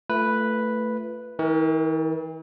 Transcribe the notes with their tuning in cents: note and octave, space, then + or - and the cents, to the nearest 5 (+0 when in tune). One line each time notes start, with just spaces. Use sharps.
A3 +15 F4 -30 B4 +0
E3 -45 A#4 +0